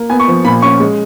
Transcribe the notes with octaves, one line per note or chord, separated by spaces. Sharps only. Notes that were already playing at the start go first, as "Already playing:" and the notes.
Already playing: A#3
B3 G#5
C#6
F3
A#2 B5
C#4 C#6
G#3